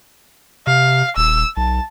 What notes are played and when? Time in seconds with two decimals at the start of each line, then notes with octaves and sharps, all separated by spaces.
0.67 C3 F5
1.17 D#1 E6
1.57 B1 A5